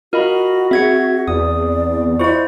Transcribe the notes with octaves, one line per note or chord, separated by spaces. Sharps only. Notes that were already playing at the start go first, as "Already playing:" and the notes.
F4 F#4 A#4 D#5 B5
C4 G#4 E5 G#6 C#7
E2 D5 D#6
E4 F4 C5 D#5 C#6